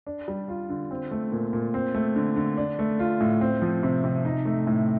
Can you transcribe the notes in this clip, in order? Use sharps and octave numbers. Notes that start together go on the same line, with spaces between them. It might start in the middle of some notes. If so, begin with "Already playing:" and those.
D4
G3
F4
D3
C4
A3
A#2
A#2
C4
A3
D3
D3
D4
A3
F4
A2
C4
F3
C3
C3
D#4
A3
A2